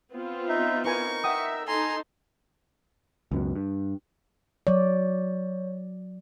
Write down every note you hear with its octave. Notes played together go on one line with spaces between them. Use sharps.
B3 C4 F4
D#4 E5
D#4 E4 A#4 B4 G#5 C#6
E5 F#5 G5 D#6
D#4 A4 G#5 A#5 C6
C#2 F#2 B2
G2
F#3 C#5 D5